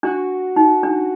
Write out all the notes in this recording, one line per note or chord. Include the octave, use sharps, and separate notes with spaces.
D4 F#4
D#4
D4